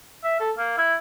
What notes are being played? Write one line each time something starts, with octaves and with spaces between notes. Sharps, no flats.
E5
A4
A#3
E4